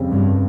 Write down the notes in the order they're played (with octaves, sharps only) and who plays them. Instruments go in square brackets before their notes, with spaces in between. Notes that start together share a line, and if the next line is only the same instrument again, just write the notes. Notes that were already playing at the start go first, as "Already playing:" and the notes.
Already playing: [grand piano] F2 C#3 G3 C4
[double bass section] G2